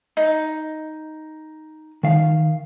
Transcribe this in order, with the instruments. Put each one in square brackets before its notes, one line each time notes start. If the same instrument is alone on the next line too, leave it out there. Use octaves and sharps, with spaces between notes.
[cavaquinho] D#4
[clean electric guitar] D#3 F5